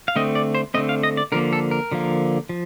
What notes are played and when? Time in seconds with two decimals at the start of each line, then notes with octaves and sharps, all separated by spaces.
0.08 F5
0.16 D3 A3 C4 D#5
0.35 D5
0.55 C5
0.74 D3 A3 C4 D#5
0.89 F5
1.03 D#5
1.17 D5
1.32 D3 F3 A#3 A#4
1.53 A4
1.71 A#4
1.92 D3 F3 A#3
2.49 F3